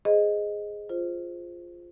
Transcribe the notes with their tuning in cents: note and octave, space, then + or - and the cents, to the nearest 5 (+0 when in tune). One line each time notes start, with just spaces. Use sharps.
G#4 +0 C5 +0 D#5 +0
F4 +0 C5 +0